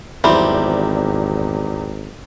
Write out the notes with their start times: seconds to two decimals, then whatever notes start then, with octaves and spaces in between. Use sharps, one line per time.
0.24 G#1 E2 F#3 G3 C4 E4